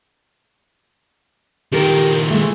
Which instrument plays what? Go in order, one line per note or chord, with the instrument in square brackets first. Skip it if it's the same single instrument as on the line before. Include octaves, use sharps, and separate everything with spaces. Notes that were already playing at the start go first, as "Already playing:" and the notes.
[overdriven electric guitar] D#3 F3 [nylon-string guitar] G4 A4 A#4
[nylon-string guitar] G#3 A3